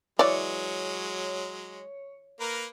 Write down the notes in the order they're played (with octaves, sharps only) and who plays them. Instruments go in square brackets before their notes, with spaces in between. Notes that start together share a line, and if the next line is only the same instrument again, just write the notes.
[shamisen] E3 D5 [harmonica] F#3 G#3 [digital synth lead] C#5
[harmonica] A#3 A#4 B4